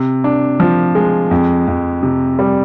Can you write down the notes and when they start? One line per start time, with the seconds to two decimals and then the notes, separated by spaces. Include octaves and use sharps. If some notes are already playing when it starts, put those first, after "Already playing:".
Already playing: C3
0.24 D4
0.60 F3
0.95 G#3
1.31 F2
1.68 F2
2.03 C3
2.39 G3